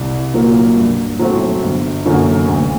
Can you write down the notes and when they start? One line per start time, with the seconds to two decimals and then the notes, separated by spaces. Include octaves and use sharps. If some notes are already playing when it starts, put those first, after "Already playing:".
Already playing: C2
0.34 A#2 F#3 A#3
0.77 G2
1.19 F#3 A3 C4 F#4
1.63 G1
2.06 F#2 D3 F#3 A#3
2.48 D2